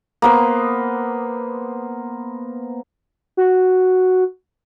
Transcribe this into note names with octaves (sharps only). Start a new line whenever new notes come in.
A#3 B3 C5
F#4